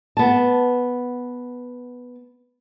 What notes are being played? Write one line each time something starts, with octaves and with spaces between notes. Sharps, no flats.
B3 A5